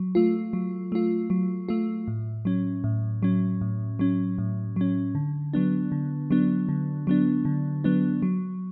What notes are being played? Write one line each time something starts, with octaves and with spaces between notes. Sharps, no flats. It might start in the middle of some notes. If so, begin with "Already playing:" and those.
Already playing: F#3
A3 F4
F#3
A3 F4
F#3
A3 F4
A2
F#3 C#4
A2
F#3 C#4
A2
F#3 C#4
A2
F#3 C#4
D3
F#3 B3 D4
D3
F#3 B3 D4
D3
F#3 B3 D4
D3
F#3 B3 D4
F#3